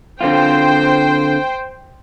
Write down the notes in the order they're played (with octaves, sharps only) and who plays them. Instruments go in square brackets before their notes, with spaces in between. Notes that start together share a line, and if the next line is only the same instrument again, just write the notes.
[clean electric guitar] D3 C4 F4 [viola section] C5 G5